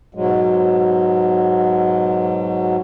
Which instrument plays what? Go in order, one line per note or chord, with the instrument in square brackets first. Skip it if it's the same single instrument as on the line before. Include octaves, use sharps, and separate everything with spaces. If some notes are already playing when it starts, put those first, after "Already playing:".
[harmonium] G#2 B2 F#3 G#3